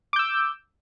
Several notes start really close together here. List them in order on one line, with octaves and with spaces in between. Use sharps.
D6 G6 E6